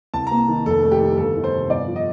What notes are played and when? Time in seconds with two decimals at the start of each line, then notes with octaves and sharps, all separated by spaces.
0.14 C2 A5
0.27 A#3 A#5
0.48 D#3
0.66 F1 A4
0.83 A3
0.91 G4
1.00 D#3
1.18 G1 A4
1.35 D#3
1.44 C5
1.52 C3
1.70 G1 D5
1.88 F3
1.96 D#5